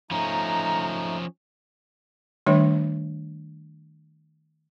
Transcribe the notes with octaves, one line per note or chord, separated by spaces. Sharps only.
F3 A3 C#4 D#4 A#5
D#3 G3 A3 D4 C#5 E5